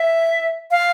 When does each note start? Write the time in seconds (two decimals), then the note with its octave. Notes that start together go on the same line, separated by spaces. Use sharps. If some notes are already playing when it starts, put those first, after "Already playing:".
Already playing: E5
0.71 F5